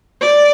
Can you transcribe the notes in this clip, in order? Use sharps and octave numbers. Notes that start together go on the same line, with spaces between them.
D5